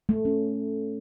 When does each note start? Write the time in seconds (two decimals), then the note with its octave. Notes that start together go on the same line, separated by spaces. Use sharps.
0.09 A3
0.25 C#4